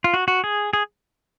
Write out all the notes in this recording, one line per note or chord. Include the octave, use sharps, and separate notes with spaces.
F4
F#4
F#4
G#4
G#4